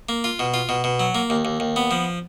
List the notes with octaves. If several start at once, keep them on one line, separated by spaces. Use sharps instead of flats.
A#3
F4
B2
F4
B2
B2
F#3
A#3
D#2
D#2
D#2
B3
F3